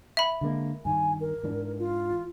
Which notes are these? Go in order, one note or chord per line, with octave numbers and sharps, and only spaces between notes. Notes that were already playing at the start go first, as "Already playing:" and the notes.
E5 B5
D3 G#3 A#3
G2 D#3 G#5
A#4
G#2 E3 D4
F4